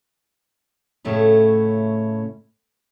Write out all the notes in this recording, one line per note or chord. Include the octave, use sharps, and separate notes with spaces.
A2 C#3 A3 C#4 E4